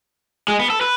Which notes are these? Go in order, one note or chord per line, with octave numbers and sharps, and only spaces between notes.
G#3
B3
A4
B4